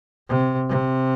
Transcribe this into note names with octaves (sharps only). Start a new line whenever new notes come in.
C3
C3